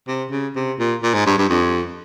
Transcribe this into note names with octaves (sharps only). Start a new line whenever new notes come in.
C3
C#3
C3
A#2
A#2
G#2
G2
G2
F2